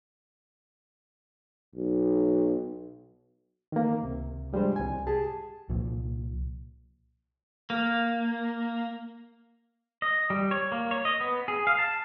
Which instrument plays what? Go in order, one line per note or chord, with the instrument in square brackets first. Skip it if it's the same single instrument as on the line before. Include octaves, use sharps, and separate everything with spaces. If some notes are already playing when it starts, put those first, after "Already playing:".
[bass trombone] B1
[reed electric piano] D#3 A#3
C#2 C3
F3 G3 G#3 D4 C5
C2 G#5
G4 G#4 A5
[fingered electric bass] C2 A#2 F3
[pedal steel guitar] A#3
D#5
G3
C#5
A#3
C#5
D#5
B3
G#4
F5
A5